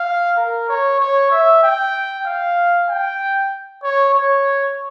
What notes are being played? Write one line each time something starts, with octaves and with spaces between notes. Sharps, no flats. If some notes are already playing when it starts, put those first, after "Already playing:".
Already playing: F5
A#4
C#5
C#5
E5
G5
F5
G5
C#5
C#5